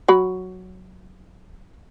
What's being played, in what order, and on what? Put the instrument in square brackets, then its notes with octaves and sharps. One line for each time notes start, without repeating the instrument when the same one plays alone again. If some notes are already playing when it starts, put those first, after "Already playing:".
[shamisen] F#3 B5